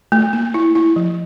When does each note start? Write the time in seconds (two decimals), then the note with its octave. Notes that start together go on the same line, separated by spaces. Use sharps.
0.12 A3
0.33 A#3
0.54 E4
0.75 E4
0.96 F3